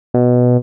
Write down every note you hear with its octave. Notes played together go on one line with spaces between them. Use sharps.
B2